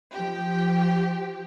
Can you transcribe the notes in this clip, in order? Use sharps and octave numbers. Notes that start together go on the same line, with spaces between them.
F3 G4